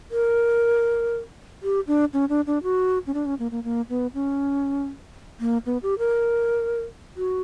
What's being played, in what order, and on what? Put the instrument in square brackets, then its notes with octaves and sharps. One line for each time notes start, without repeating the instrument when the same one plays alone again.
[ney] A#4
G4
D4
C#4
D4
D4
F#4
C#4
D4
C#4
A#3
A#3
A#3
B3
C#4
A#3
B3
G4
A#4
F#4